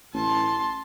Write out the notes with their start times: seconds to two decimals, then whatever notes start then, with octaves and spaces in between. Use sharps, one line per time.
0.14 A1 A5 C6